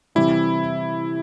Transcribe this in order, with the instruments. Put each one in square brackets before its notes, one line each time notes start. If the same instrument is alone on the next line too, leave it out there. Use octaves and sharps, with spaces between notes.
[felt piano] C3 E3 G3 C4 [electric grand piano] E4